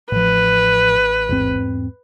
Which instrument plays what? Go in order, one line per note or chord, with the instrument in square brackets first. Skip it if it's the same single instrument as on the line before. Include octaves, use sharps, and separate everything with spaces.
[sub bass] A1 [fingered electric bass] A2 F3 [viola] B4
[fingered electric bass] E2 G#2 C4